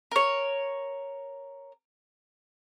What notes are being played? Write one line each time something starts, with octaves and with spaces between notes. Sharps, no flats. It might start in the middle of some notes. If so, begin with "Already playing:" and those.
A#4 C#5